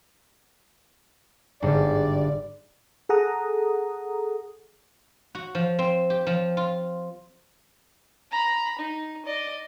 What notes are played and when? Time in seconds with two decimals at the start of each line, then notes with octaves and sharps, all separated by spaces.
1.62 G1 G#2 D5
3.09 G#4 A4 F#5 A#5 D#6
5.35 F#4
5.55 F3
5.79 C4
6.10 G4
6.27 F3
6.57 F4
8.31 A#5 B5
8.78 D#4
9.25 D5 D#5